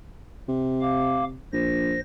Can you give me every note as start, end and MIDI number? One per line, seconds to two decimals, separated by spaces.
0.48 1.40 48
0.81 1.25 77
0.81 1.25 86
1.53 1.97 34
1.53 2.00 72
1.53 2.00 94